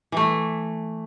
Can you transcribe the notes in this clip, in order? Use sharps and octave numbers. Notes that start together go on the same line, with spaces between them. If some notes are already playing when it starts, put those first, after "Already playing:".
E3 A3